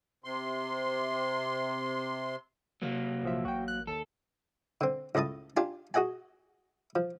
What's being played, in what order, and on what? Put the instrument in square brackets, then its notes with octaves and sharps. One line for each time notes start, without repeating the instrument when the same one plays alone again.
[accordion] C3 C6
[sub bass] C3 [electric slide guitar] F#3 A#3
[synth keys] A#1 F3 E5
[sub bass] A1 [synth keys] F#4 G5
[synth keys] F#6
[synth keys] D#2 [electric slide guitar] A4
[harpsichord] D3 C4
C#2 A2 D#5 A5 D#6
D4 F4 G4 G#5
F#4 G#4 D#5 F#5 G#5
F3